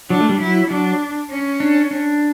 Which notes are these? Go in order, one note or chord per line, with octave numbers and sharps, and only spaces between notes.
F#3 D4
A3
G3
F#3 E4
F#3 D4
C#4
D4
D4